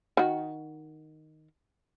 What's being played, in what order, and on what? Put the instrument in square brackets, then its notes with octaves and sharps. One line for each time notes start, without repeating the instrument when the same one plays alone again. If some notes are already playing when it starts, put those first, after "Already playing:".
[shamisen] D#3 F#4